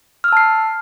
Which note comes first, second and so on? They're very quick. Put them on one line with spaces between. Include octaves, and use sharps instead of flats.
F6 E6 A5 C7